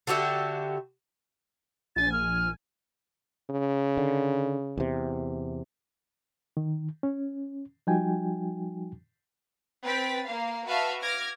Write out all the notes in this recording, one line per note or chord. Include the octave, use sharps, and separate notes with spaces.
D3 F#4 G4 E5
A#1 G#5 A6
F6
C#3
D3
E2 C3
D#3
C#4
F3 G3 D#4 F#4 G5 G#5
C4 B4 G5 A6 B6
A#3 F5
F#4 B4 E5 F5 A5
D6 F6 G#6 A#6